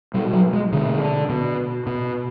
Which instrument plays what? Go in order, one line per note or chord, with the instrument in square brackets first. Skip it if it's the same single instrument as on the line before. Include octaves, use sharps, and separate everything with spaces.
[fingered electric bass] B2 G3
F#3
G#3
B2 D3
B2
B2